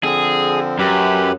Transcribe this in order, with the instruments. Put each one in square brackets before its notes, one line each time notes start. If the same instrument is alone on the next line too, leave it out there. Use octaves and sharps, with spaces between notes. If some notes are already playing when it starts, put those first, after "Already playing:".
[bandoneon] D3 F3 C4 [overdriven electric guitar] G#4
[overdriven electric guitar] F#2 [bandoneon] G4 B4 B5